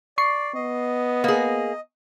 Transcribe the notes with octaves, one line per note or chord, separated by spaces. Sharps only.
D5 C#6 C7
B3 D#5
A#3 G#4